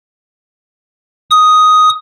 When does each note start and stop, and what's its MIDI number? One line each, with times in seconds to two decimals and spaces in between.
1.31 1.89 87